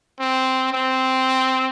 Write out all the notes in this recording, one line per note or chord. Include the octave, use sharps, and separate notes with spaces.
C4
C4